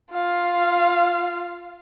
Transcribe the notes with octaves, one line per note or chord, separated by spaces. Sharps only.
F4 F5